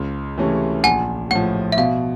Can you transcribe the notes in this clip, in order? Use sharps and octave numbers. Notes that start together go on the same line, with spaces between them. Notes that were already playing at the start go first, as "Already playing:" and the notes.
Already playing: C#2
C3 E3 A3 C#4
A#1 F#5 G#5
A2 F3 F#5
E5
B2 F5